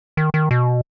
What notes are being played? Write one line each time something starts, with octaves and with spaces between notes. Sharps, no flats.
D#3
D#3
B2